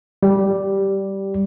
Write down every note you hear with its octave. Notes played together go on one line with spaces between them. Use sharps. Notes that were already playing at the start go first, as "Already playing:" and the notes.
G3 G4